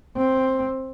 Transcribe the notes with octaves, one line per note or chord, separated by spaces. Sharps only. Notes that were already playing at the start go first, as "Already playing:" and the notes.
C4